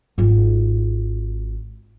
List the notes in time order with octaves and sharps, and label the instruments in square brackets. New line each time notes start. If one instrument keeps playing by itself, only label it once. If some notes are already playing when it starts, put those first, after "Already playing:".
[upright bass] G#1 F4